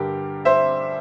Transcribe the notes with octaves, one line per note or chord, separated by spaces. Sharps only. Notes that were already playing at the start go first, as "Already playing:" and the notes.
Already playing: G2 D3 G4 A#4
C5 E5